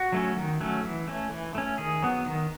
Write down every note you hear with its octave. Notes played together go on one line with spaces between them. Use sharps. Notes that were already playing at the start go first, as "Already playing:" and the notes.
Already playing: F#4
F#3 A3 C#4
D#3
F#3 A3 C#4
E3
A3 C#4
E3
A3 C#4
D#3 G#4
F#3 B3
D#3